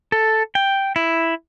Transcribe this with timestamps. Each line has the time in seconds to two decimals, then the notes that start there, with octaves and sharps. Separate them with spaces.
0.12 A4
0.55 G5
0.96 E4